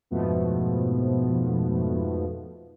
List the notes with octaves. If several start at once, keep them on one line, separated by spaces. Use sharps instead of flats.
F2 G#2 B2 F3 A3 B3